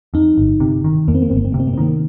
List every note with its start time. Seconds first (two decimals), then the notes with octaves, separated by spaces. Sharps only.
0.14 F2 D#4
0.37 G1
0.60 C3
0.84 D#3
1.08 F2 A#3
1.15 C4
1.22 A#3
1.30 G1 C4
1.36 A#3
1.45 C4
1.52 C3 A#3
1.59 C4
1.67 A#3
1.74 C4
1.78 D#3 A#3